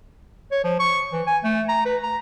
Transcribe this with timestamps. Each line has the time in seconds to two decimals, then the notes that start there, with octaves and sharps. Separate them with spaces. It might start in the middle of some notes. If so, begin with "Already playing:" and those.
0.51 C#5
0.64 F3
0.79 C#6
1.13 E3
1.27 G#5
1.44 A3
1.69 A#5
1.86 B4
2.03 A#5